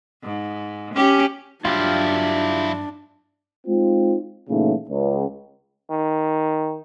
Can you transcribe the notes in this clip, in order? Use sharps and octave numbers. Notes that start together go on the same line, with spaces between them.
G#2
C#4 G4
G2 F#3 D4 E4 F4 G4 F5
G#3 C4 D#4 F4
A#2 C#3 E3 F#3 A3 D#4
C#2
D#3